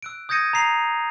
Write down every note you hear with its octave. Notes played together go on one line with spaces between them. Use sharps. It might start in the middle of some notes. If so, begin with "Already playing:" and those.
E6 F#6 D7
D#6 G6 G#6 A#6 C#7 D#7
A#5 A#6 C7 F7